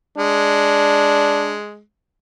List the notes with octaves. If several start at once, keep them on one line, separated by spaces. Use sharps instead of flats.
G#3 D4